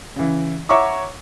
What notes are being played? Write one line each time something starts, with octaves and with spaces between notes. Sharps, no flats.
C#3 E3
C#5 E5 F#5 A#5 C#6 D6